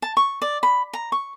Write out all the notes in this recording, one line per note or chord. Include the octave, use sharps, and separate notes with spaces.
A5
C#6
D5
B5
A#5
C#6